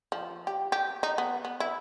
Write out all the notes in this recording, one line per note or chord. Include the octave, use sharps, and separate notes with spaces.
F3
G4
G4
D#4
B3
B3
E4